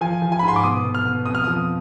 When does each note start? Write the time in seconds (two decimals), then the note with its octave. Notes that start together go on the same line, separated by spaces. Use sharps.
0.01 F3 G#5
0.22 F3
0.32 G#5
0.39 B5
0.43 G#2
0.48 C6
0.56 D6
0.63 B2 D#6
0.84 B2
0.95 F6
1.05 B2
1.26 F2 D#6
1.35 F6
1.44 F3 D#6